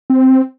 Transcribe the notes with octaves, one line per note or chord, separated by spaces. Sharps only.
C4